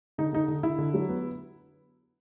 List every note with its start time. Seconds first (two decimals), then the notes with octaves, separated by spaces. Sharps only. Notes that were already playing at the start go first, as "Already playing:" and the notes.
0.18 D3 D#4
0.33 D3 D#4
0.48 D3
0.63 D3 E4
0.78 D3
0.94 F#3
1.09 B3